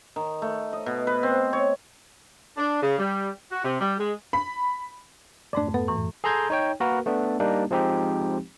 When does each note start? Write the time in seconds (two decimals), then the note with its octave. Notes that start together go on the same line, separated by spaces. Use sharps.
0.16 D#3
0.42 A3
0.73 D#5
0.86 B2
1.07 B4
1.23 C4
1.53 C#5
2.57 D4
2.81 C#3
2.98 G3
3.50 F#4
3.63 C3
3.80 G3
3.98 G#3
4.33 B5
5.53 F2 G#2 A3 D4 D5
5.74 B3 A4
5.88 F#2 A2 E3
6.24 G#4 A4 A#5 C6 G6 G#6
6.50 D#4 C#5 G5
6.80 A#3 F#4 A#4 B4
7.06 A3 B3 D4
7.40 G3 A#3 D4 D#4 G4
7.71 F3 G#3 C4 D#4 G4